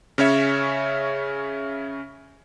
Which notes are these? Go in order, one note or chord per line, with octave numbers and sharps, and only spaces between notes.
C#3 C#4 C#5 E5